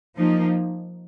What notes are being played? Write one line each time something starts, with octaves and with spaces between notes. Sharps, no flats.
F3 A#3 D#4